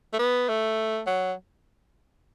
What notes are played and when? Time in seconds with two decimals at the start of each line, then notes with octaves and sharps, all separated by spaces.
0.13 A3
0.19 B3
0.48 A3
1.07 F#3